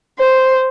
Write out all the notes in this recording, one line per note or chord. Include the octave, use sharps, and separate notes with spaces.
C5